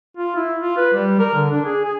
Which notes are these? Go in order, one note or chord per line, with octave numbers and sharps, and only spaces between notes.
F4
E4
F4
B4
G3
A#4
D3
D4
G#4
G#4